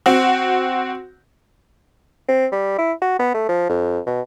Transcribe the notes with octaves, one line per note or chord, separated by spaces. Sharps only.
C4 F#4
C4
G3
E4
F#4
B3
A3
F3
F2
B2